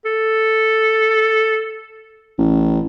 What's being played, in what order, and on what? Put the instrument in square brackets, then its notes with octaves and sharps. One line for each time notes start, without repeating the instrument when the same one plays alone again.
[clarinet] A4
[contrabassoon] A1